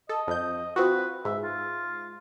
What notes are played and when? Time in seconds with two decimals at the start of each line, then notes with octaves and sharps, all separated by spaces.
0.09 A4 D#5
0.27 F2 G6
0.76 C4 F4 F#4 B4
1.25 G#2 E5
1.43 F4